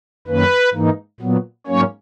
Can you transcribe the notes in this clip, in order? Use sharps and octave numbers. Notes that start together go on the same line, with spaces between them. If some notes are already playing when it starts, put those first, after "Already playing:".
F#2 D#3 A#3 C#4 B4
G#2 E3 A#3 D#4
A#2 F#3 B3
G#2 F#3 A#3 C#4 C#5